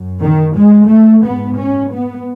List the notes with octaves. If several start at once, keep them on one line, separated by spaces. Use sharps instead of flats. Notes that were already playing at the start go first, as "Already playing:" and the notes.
Already playing: F#2
D#3
G#3
A3
G#2 B3
C#4
B3